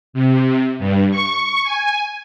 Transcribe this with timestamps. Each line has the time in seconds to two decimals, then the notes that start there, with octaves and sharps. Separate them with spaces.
0.13 C3
0.79 G2
1.11 C#6
1.64 G#5